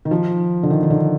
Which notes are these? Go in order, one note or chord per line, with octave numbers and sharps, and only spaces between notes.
D#3
F3
D3
D#3
D#3
D3